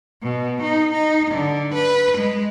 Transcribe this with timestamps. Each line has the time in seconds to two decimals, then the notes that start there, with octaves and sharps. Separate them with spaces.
0.23 B2
0.63 D#4
0.92 D#4
1.31 D3
1.75 B4
2.18 G#3